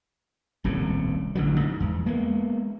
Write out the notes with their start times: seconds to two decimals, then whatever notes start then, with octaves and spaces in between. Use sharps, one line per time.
0.64 D#1 C2 A2 C#3
1.35 A1 D3 F#3
1.60 G#2
1.80 E2
2.06 G#3 A#3 B3